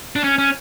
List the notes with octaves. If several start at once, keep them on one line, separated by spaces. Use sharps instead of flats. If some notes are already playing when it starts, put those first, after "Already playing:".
D4
C#4
C#4